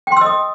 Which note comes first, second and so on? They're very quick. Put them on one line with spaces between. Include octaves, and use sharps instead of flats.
G5 C6 E6 D#5 D#6